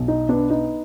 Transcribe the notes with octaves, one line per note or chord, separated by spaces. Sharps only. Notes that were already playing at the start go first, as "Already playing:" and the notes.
Already playing: B1
D#4
B3 D4
D#4